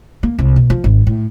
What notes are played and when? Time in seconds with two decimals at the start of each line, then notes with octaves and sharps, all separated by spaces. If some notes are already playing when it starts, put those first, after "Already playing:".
0.23 A#3
0.39 C2
0.56 B2
0.70 F3
0.84 G#1
1.07 A2